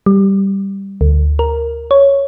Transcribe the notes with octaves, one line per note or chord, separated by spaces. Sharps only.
G3
D2
A#4
C#5